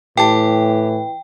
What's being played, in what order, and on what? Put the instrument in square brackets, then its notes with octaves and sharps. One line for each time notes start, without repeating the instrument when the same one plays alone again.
[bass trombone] A2 [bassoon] E3 [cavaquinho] G4 A5 [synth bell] G5